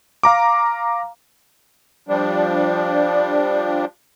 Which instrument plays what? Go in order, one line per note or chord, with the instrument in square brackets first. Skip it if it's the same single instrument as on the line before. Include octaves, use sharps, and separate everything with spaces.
[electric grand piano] F5 A#5 D6
[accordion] F3 G3 D4